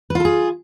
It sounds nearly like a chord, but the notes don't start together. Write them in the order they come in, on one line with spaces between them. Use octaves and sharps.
B4 F4 A4 G#4